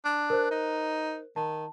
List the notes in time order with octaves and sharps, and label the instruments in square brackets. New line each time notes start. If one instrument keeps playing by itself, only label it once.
[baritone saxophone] D4
[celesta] A#4 C5 F#6
[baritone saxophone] D#4
[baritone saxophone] D#3 [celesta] A5